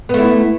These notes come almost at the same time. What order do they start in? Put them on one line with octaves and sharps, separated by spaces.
B3 A3 E4